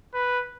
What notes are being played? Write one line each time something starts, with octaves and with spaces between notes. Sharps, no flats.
B4